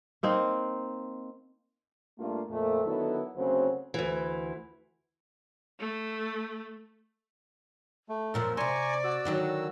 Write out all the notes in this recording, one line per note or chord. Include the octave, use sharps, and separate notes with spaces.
A#3 C4 D#4
G2 A3 A#3 D4 F4
F2 A#2 A3
D3 D#3 F#3 B3 E4 A4
D2 C#3 F#3 A#3 C4 C5
D2 E3
A3
A3
F#2 A#2 F3 A#4 E6
C3 C5 D5 G#5 A#5 C#6
F#4 E6
D3 D#3 F#3